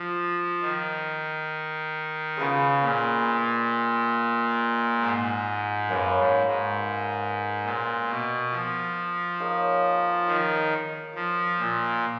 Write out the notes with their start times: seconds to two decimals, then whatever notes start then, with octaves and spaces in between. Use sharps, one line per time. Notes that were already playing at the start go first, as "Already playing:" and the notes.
Already playing: F3
0.62 D#3
2.37 C#3 G#3 B3 F4 G#4
2.82 A#2
5.00 G#2
5.89 F#2 A#3 C#4 F#4 B4
6.18 G#2
6.47 G#2
7.65 A#2
8.09 B2
8.52 F3
9.40 A#3 D#4 G#4 C#5
10.27 D#3
11.15 F3
11.59 A#2